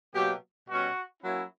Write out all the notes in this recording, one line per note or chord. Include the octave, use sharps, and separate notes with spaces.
B2 F#3 A#3 G4
B2 G3 C#4 F#4
F#3 A#3 C#4 E4